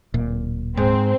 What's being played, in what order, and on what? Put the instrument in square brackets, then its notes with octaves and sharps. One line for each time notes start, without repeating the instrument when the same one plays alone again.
[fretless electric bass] D1 A#2
[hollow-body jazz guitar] G#2 [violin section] C4